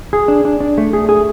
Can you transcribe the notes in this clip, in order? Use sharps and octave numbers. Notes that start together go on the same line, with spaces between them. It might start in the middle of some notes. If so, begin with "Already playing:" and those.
G#4
D4
D4
D4
A3
G#4
G#4